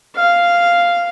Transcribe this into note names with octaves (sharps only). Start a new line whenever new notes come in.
F5